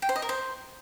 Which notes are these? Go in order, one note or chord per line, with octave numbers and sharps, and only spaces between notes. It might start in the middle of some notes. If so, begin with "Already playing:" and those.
G5
C5
D#5
A#4
C5